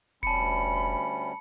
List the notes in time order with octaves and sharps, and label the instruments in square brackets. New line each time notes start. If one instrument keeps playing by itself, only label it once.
[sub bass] F1 [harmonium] D2 G3 C#4 [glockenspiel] A5 C#7 [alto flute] B5